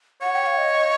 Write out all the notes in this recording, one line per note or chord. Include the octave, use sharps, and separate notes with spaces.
C#5 F#5
G5
F5
D#5